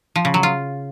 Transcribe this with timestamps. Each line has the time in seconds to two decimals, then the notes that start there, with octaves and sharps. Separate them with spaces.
0.16 F3
0.25 C#3
0.34 F#3
0.43 F4